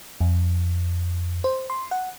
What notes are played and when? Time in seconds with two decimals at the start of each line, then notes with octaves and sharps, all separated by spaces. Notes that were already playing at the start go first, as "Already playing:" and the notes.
0.21 F2
1.44 C5
1.70 C6
1.91 F#5